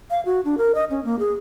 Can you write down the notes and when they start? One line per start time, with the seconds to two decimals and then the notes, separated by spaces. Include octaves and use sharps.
0.10 F5
0.26 F#4
0.45 D4
0.58 A#4
0.75 D#5
0.90 C#4
1.05 A#3
1.19 G#4